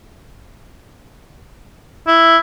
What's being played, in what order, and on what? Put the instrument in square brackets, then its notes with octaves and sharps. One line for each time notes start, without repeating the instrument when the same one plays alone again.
[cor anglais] E4